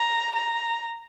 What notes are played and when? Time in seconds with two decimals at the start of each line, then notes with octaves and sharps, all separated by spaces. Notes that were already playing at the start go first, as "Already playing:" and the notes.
Already playing: A#5
0.35 A#5